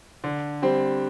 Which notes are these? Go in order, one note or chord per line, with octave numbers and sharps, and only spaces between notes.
D3
G3 C4